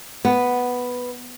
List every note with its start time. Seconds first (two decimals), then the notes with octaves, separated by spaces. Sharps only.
0.25 B3